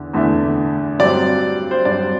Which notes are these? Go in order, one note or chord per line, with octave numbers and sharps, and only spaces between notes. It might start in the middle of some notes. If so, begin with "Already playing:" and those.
Already playing: E2 D3
E2 D3 A3
G2 F#3 C4 D5
C5
G2 F#3 C4 D5